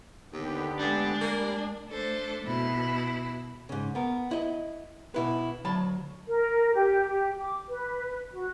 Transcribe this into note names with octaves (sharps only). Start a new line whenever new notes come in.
D#2 D3 B3 G4
G2 G#3 A3 D4
G3 A#3
A3 D4 A4 C5
B2 E4
G#2 C#3
B3 A#4
E4 D#5
B2 E4 B4
D2 F#3 A5 B5
A#4
G4
G4
D6
B4
F#4